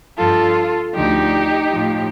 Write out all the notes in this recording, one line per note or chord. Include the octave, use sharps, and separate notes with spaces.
G2 F3 F4 A4
D2 D3 F3 D#4 G4
A2 F3